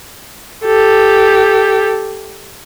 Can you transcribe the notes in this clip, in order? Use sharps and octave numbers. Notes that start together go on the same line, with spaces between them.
G4 A4